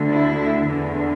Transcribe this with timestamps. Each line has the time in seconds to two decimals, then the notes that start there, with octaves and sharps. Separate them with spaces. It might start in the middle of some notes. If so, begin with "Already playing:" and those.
Already playing: D2 D3
0.11 E4
0.68 E2 D3